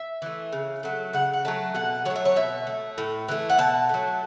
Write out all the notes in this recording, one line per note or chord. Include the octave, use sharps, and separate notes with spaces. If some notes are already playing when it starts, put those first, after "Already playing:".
Already playing: E5
E3 A3
C#3
F#3 A3
C#3 F#5
F#5
F#3 A3 A5
B2 F#5
F#3 A3 C#5
E5
C#5
B2 E5
A3
A2
E3 A3
F#5
B2 A5
F#3 A3